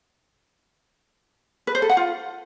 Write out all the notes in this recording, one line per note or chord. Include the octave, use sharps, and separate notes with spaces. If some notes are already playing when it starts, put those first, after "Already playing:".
B4
C5
A4
F#5
F4